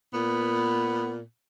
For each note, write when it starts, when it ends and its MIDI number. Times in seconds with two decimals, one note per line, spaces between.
0.13 1.21 46
0.13 1.21 59